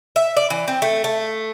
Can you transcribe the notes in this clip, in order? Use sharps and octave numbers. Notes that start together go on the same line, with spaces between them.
E5
D5
E3
C4
A3
A3